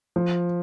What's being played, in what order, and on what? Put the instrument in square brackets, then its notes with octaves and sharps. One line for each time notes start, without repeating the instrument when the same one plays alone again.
[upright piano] F3